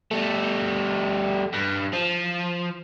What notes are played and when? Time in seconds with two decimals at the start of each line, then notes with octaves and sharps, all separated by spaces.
0.11 G3 A3
1.54 G2
1.93 F3